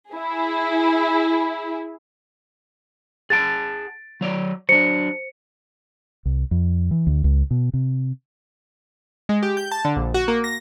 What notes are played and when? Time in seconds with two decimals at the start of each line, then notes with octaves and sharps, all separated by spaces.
0.11 E4 G#4
3.30 G#4 F#5 A5 A6 D7
4.21 F#3 C#5 D5
4.69 F#3 D4 C5 C#7
6.25 C2
6.51 F2
6.91 E3
7.07 D2
7.24 C#2
7.51 B2
7.74 C3
9.29 G#3
9.43 G4
9.57 G6
9.72 A5
9.85 D3
9.96 A#1
10.14 F#4
10.28 A#3
10.44 A#6